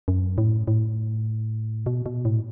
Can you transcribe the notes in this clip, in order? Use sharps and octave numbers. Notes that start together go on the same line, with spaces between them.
F#2
A2
A2
B2
B2
A2